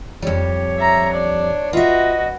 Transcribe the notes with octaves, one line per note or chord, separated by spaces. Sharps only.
F2 G3 C#5
E5 A#5
D4 D5
F4 F#4 B4 D#5 E5